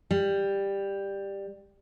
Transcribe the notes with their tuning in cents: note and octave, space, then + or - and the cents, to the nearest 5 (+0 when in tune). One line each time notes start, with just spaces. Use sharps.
G3 +10